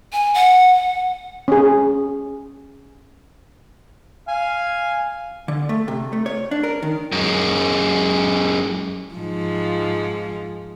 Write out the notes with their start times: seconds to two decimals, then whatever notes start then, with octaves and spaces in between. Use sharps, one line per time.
0.13 G#5
0.34 F#5
1.48 C#4 G#4
4.28 F5 G#5
5.48 D3
5.69 A3
5.88 C3
6.13 A3
6.26 C#5
6.51 D4
6.63 A#4
6.82 D#3
7.12 F#2 G#3
9.14 G#2 F3